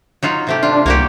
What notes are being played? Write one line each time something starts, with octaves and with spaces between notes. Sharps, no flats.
F#3 D#4 F4
C3 A3 G4
D4 F4
C2 A#3 F#4 G4